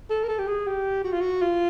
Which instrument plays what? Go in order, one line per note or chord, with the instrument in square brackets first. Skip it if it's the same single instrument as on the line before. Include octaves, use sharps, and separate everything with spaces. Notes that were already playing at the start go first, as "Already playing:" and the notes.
[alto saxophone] A4
A#4
A4
G4
G#4
G4
F#4
F4
F#4
F4